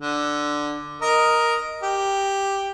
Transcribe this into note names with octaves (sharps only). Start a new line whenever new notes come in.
D3
A#4 D#5 A#5
G4